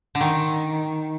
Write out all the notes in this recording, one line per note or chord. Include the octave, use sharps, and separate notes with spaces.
D3
D#3